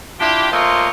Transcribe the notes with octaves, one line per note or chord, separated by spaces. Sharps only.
D4 E4 F4 G4
A3 A#3 F4 C5 C#5 D#5